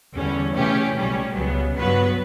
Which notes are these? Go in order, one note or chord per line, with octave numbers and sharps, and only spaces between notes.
E2 D3 G3 C#4
C#3 E3 A3 C#4 G4
B1 B2 G3 C#4
C#2 C#3 F#3 B3
G2 F#3 B3 F#4 B4